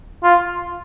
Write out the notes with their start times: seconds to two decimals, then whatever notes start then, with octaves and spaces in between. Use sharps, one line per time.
0.24 F4